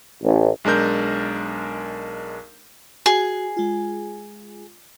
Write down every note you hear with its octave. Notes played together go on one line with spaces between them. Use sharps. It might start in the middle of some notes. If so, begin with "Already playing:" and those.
A1
B1 G#3 D4 A#4 G6
F#4 G#4
G#3 F4